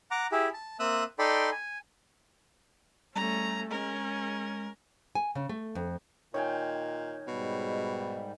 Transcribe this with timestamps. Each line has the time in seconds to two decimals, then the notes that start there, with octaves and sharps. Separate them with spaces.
0.11 F#5 A#5 D6
0.32 E4 G4 G#4
0.54 A5
0.79 A#3 C4 E5 D#6 E6 F#6
1.19 D#4 A4 D5 G5 B5 C6
1.52 G#5
3.15 G3 A3 C#4 A#5
3.71 G#3 C#4 A#4
5.15 G#5
5.35 C#3
5.49 A3
5.75 F2
6.34 A#2 D#3 C#5 G5 G#5
7.27 G#2 B2 G3